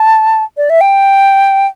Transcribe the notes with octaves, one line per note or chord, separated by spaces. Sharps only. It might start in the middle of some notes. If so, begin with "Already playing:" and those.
Already playing: A5
D5
E5
G5